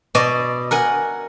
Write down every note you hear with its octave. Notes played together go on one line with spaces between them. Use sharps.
B2 D5 D#5
A#4 F#5 G#5